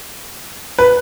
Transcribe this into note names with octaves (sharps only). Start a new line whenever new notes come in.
B4